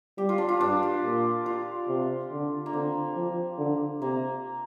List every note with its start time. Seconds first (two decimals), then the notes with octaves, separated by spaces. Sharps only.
0.18 G3 G4
0.29 F4
0.38 D4
0.49 F4
0.61 G2 D4
0.83 G4
1.03 A#2
1.46 F4
1.88 C3
2.31 D3
2.66 A#3
2.73 D3 C4
3.16 F3
3.58 D3
4.01 C3 A#3